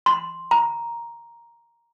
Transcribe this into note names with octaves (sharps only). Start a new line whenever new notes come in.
C6
A#5